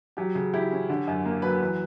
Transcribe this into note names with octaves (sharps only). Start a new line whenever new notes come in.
F#3 G4
C#3
E4 G4
C#4
D3
F#2
A#3
F#3 B4
E3 B4